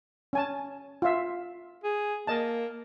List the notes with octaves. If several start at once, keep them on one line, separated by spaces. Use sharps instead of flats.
C#4 G#5 A5
F4 E5
G#4
A#3 D#5 A5